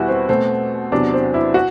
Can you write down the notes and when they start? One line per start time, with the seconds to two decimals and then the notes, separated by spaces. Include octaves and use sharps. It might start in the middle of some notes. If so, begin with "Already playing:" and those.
Already playing: E2 B2 G3 E4 F#4
0.08 C4
0.29 B2 A3 C4
0.92 E2 C3 F#3 D4
1.13 C4
1.34 E4
1.54 F#4